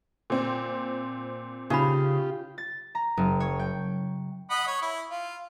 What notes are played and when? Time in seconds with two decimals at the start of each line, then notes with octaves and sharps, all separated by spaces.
0.30 A#2 C4
1.70 C#3 D#4 F4 G4 C#5 B5
2.58 A6
2.95 A#5
3.17 F#1
3.40 C#5
3.59 G5
4.50 D#5 F#5 B5
4.67 C#5
4.82 E4
5.11 F4